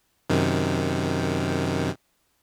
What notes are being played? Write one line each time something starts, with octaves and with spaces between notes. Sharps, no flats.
F#2 C3 D#3